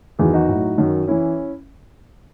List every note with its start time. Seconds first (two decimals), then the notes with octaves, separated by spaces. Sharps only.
0.19 E2 D#3 F#3 E4 G#4
0.34 D#4 F#4
0.48 A2 F#3
0.78 F#2 D#3 F#3
1.08 E3 C#4 E4